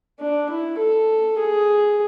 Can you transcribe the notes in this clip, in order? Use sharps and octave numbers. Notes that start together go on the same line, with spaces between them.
D4
E4
A4
G#4